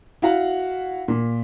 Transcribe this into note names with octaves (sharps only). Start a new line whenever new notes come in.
E4 F#4 F5 F#5
A#2